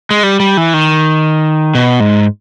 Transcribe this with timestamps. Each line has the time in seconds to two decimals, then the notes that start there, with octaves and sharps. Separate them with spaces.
0.11 G#3
0.23 G3
0.40 G3
0.57 E3
0.74 D#3
1.75 B2
2.00 G#2